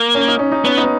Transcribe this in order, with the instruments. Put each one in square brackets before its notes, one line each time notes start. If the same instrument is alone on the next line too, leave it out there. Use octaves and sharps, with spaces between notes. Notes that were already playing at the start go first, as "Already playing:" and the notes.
Already playing: [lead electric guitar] A#3
[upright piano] C#4
D#4
C#4
D#4
[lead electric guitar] B3 [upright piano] C#4
[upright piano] D#4
B3